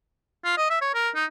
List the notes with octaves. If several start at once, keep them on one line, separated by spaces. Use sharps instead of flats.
F4
D#5
E5
C#5
A#4
D#4